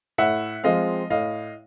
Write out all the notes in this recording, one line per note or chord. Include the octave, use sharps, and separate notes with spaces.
A2 E5 F#5
F3 G#3 C4 D#5 F5
A2 D#5 F5